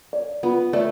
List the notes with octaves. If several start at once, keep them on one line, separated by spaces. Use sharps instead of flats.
D5
B3 F4
A3 D5